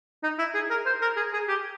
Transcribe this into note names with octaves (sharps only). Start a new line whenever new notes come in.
D#4
E4
G#4
A#4
C5
A#4
G#4
G#4
G4